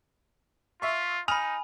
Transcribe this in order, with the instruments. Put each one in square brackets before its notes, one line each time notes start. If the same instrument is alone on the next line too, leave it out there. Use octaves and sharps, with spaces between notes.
[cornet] F4 [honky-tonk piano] E5 C#6
[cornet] D#4 [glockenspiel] G#5 B5 [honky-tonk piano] D#6 F6 F7